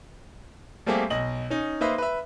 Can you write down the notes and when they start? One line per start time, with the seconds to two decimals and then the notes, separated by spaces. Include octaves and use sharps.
0.86 G3 A3 A#3 C4 G4 G#4
1.10 B1 D#5 F#7
1.50 C#4 D#4
1.81 A#3 D#4 B4 C5 D#5 E5
1.98 B4 E5